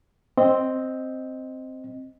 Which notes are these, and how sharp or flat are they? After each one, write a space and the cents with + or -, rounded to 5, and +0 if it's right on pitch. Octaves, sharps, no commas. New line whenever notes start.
C4 +0 D#5 +0